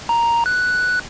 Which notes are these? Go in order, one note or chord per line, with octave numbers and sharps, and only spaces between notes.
A#5
F#6